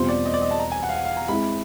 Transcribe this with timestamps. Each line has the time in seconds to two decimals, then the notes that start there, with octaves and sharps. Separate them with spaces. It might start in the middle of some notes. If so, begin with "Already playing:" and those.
Already playing: E2 B2 G3 C4 F4 C5
0.09 D5
0.25 D#5
0.34 D5
0.42 D#5
0.51 A5
0.59 A#5
0.72 G#5
0.83 F#5
0.89 F5
0.95 F#5
1.05 F5
1.17 A#5
1.28 G#3 C4 E4 B5